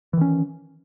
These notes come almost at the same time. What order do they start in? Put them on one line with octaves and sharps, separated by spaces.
E3 D#3 C#4